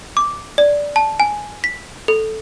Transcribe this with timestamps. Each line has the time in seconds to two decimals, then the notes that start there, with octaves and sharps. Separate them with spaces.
0.17 D6
0.58 D5
0.96 A5
1.20 G#5
1.64 B6
2.08 A4